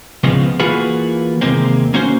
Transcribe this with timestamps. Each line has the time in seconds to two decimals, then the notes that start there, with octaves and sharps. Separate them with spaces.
0.24 C#2 C#3 F3 G#3 B3 C4
0.60 E3 A#3 F4 F#4 G#4 B4
1.41 D#2 C3 G#3 A#3 C4
1.94 A#3 C#4 F#4 C5